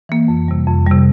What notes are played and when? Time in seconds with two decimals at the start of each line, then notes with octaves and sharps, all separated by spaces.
0.09 E3 A#3
0.28 F2
0.48 C3 G3
0.68 F2
0.87 C3 G3